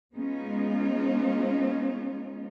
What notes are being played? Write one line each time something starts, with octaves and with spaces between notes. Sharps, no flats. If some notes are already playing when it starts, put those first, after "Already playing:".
G#3 B3 C#4 D#4 F4